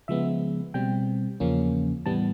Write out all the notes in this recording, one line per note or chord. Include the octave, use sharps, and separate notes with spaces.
C#3 F3 G#3 B3 E5
B2 G3 C4 G5
E2 C#3 F3 A#3 C#4
A2 E3 G3 B3 A5